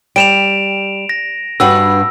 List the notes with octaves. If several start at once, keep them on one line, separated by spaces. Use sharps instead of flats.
G3 D7 E7 F7
A#6
G2 F#4 B4 E6